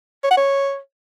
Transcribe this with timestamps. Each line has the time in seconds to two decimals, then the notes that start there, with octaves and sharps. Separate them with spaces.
0.24 C#5
0.30 F#5
0.37 C#5